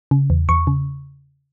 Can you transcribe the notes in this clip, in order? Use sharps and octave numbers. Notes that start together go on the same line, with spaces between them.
C#3
E2
E2 C#6
C#3